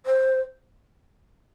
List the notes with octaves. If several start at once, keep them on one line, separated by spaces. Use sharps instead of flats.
C5